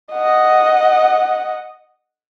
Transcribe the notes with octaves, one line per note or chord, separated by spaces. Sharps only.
D#5 F#5